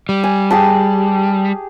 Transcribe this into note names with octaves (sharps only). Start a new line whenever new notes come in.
G3
G#5
G4 G#4 A5